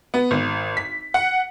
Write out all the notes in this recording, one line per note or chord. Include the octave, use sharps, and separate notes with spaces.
B3
G#1
B6
F#5